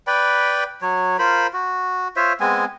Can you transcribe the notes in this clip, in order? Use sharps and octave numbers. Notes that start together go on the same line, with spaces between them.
B4 D5 G5 B5
F#3 C#5
F4 A#4 C5 B5
F#4
F4 C5 C#5 E5
G#3 B3 C4 G#5